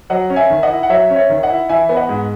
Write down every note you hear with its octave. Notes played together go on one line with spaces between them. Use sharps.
F#3 D#5 F#5
C#4
E5 G#5
D#3
D#5 F#5
E4
F#5
F#3 C#5 E5
C#4
C#5 E5
D#3
D#5 F#5
E4
E3 E5 G#5
B3
D#5 F#5
G#2